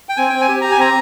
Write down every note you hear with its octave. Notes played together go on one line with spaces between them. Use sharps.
G5
C4 G#5
C4 G5
G#5
G4
G4 A#5
G#5
C4 A#5